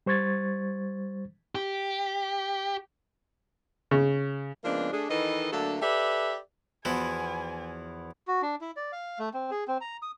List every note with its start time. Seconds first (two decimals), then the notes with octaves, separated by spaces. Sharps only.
0.06 G3 C5 C#6 G#6 A6
1.55 G4
3.91 C#3
4.64 C#3 F3 G#3 A#3 B3 D4
4.92 A3 D4 G#4
5.09 D#3 E3 A4 B4 D#5
5.52 D3 F#3 A3 A#3 D4 A4
5.81 G4 A4 B4 D5 E5
6.85 E2 F3 E4 F#4 G#5
8.28 F#4
8.42 D4
8.61 E4
8.77 D5
8.93 F5
9.19 A3
9.34 C4
9.51 G#4
9.68 C4
9.81 A#5
10.02 D#6